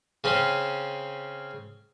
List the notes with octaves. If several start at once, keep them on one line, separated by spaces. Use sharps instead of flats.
C#3 C4 C#4